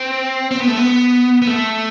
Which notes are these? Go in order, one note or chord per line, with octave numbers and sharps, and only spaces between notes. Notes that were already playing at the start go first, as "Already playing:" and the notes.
Already playing: C4
C4
B3
A3
B3
B3
A3